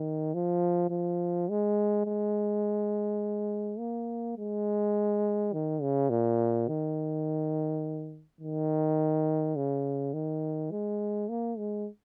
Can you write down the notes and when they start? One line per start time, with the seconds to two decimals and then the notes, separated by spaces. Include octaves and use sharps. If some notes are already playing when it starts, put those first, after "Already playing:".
Already playing: D#3
0.34 F3
0.91 F3
1.49 G#3
2.06 G#3
3.79 A#3
4.38 G#3
5.53 D#3
5.82 C#3
6.10 A#2
6.68 D#3
8.41 D#3
9.56 C#3
10.14 D#3
10.71 G#3
11.29 A#3
11.58 G#3